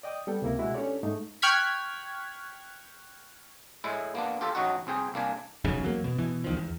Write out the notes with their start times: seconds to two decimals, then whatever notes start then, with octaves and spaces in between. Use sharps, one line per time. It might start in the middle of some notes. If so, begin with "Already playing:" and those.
0.03 D5 D#5 G5 D6 D#6
0.27 G3 B3 A4 G5
0.42 C#2 C3 A#3 E4 A#4
0.59 B2 G#3 E4 F#4
0.74 C#4 D4 G4 A4 C#5 D5
1.03 G#2 A3 D#4
1.42 G5 C#6 F6 F#6 G#6 B6
3.84 A2 G#3 E4
4.15 A#3 B3 D4
4.41 F4 G4 A4
4.55 A1 F#3 D#4 F#4
4.87 C2 C4 G#4 G5
5.14 C2 A#3 D4 G#5
5.64 F1 B1 F#2 C#3
5.83 E2 F#3 A#3
6.04 B2
6.18 B2 E3
6.44 C#2 D#3 F3
6.57 E2